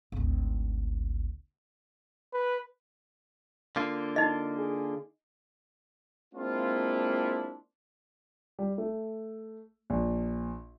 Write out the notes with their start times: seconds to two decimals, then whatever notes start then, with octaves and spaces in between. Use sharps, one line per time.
0.12 G#1 D2
2.33 B4
3.76 D3 A#3 F4
4.16 D#4 D#5
4.58 G#4
6.34 G#3 A#3 C4 D4 E4 F4
8.59 G3
8.78 A3
9.90 A#1